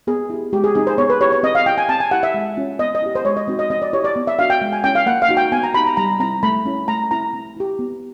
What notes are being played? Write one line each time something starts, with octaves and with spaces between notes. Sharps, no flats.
B3 G#4
E4 G4
G#3 G4
G#4
C4 D#4 G#4
C5
B3 C#5
B4
E4 G4 C#5
C#5
C4 D#5
F5
E4 G4 G5
G#5
C4 A5
G#5
E4 G4 F#5
E5
G#3
C#4 F4
B3 D#5
D#5
E4 G4
C5
G#3 C#5
D#5
C4 D#4 F#4
D#5
C4 D#5
D5
E4 G4 C#5
D5
B3
E5
D4 F#4 F5
G5
G#3
G#5
C#4 E4 G5
F5
A#3 F#5
F5
D#4 F#4
G5
B3 G#5
A#5
D#4 G4 B5
A#5
G3 A#5
C4 E4 A#5
A3 B5
C#4 E4
A3 A#5
C4 E4 A#5
C4
E4 G4
B3